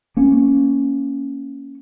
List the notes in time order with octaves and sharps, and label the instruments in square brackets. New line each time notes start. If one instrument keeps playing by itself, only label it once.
[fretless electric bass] A#3 C#4